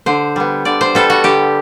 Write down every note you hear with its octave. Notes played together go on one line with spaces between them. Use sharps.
D3 C5
G3 B3
D3 D5
C5
G3 B3 A4
F#4
D3 G4